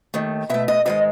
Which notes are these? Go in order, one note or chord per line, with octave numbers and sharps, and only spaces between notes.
D#2 D#3 A3
B2 A3 E5
D#5
G#2 D#3 G#3 D#5